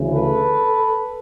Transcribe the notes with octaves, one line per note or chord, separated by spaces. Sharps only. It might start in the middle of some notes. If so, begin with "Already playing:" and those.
Already playing: D2 C#3 E3
A4 B4